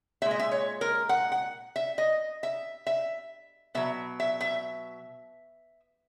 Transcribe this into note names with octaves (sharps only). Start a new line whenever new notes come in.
A#2 G#3 E5
D#5
E5
C#5
A#4
F#5
F#5
E5
D#5
E5
E5
B2 F#3 E5
E5
E5